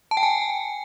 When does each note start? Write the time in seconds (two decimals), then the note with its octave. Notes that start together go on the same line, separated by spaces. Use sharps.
0.11 A5
0.17 G5
0.23 G#5